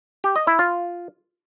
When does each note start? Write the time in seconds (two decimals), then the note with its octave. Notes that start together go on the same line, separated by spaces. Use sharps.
0.24 G4
0.36 D#5
0.47 E4
0.59 F4